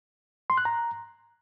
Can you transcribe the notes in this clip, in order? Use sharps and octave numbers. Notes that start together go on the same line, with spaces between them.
C6
F#6
A#5